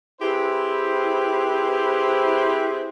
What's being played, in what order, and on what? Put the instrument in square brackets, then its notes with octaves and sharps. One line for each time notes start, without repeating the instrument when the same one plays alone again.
[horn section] C4 E4 G4 G#4 B4 C5